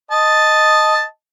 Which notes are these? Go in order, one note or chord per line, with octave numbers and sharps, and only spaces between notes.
D#5 A5